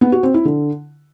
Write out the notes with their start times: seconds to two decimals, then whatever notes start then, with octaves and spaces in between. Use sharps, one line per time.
0.01 B3
0.12 F#4
0.23 C4
0.34 E4
0.45 D3